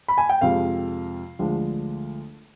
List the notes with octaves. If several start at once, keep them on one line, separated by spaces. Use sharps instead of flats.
B5
G#5
G5
F2 C3 F3 G#3 F5
D2 D3 F3 G#3